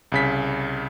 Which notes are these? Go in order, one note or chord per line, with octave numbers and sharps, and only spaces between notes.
C2 C#3 B6